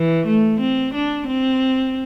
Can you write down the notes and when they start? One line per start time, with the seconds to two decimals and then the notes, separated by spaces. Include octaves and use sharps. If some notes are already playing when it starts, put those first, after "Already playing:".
Already playing: E3
0.27 A3
0.60 C4
0.94 D4
1.27 C4